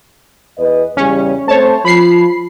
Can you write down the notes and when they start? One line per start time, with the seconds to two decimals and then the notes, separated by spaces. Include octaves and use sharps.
0.58 E2 B4 D#5
0.97 E2 C#3 G3 C#4
1.48 A3 C4 C5 C#5 A5
1.85 F3 B5 C7